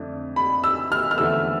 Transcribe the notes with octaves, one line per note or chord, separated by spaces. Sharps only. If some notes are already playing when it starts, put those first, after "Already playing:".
Already playing: F2 D3 A3 D4
B5
E6
F6
F6
E2 D3 F3 A3 E6